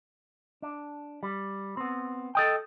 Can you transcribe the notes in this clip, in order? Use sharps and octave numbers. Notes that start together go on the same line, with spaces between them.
D4
G3
B3 C4
A4 D#5 G5